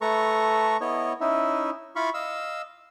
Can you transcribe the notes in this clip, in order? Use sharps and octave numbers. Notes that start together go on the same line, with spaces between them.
A3 A4 B4 A#5 C#6
B3 E4 C#5 D#5
C#4 D#4 E4 E5
E4 F4 F5 B5 C#6
D#5 F5 E6